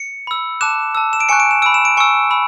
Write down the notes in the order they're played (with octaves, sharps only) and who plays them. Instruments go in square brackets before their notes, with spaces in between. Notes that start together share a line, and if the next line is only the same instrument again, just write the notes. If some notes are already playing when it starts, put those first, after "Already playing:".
Already playing: [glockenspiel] C#7
B5 E6
A5 D6 F#6 E7
A5 E6
E7
D7
G#5 C#6 F#6 C#7
D7
E7
B5 E6 D7
E7
D7
G#5 C#6 E6 C#7
B5 E6